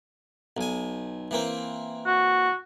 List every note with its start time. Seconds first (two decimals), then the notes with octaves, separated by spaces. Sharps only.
0.57 B1 G#5
1.31 E3 A#3 C4
2.07 F#4